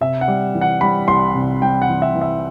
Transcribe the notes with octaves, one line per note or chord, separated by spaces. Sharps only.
C3 E5
F#5
G3
E3
F#5
G3 B5
C2 C6
C3
G3 G5
F#5
E3
E5
E3
E5